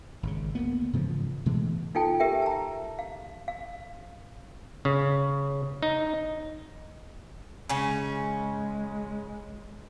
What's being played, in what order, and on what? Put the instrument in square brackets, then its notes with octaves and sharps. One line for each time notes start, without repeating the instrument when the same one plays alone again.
[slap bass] G#1 C#3
D2 A#3 B3
G#2 C#3 E3 F3
B2 E3 G#3 A3
[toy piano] D#4 F4 A4 G5 A5
G4 A#4 E5 G5
A5 A#5
F5
F5
[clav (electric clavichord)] C#3
D#4
[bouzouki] C#3 C#4 [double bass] G#3